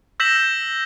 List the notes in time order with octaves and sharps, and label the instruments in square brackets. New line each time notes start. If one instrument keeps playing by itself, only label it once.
[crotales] E6 G6 A#6 B6 E7 F#7